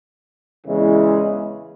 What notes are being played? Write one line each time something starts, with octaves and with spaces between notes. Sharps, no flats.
E2 C#3 E3 G#3